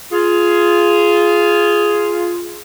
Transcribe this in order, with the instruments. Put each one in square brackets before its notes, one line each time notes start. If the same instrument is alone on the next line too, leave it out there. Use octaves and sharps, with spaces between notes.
[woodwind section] F4 G#4